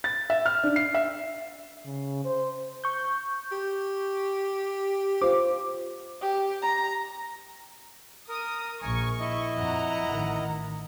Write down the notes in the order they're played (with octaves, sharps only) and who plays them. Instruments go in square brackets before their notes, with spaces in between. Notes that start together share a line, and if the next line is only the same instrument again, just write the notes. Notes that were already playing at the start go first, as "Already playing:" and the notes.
[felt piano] A6
E5
F6
D4
C7
E5
[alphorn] C#3
C5
[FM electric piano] C#6 G6
[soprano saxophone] G4
[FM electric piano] F4 D6 [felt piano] C5
[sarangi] G4
A#5
[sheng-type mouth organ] A#4 [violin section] D#6
[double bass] A#1 [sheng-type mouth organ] A#4 G#5 [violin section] C#6
[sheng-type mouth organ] E4 D#5
[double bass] F2 [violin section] F#5 A#5
[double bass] A1 D#3